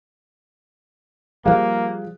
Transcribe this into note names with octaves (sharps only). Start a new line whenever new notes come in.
F3 G3 A#3 G#4 F5 F#6